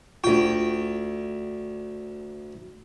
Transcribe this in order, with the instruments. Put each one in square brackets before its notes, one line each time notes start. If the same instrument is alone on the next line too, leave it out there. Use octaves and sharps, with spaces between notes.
[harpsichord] D2 G5 [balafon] F4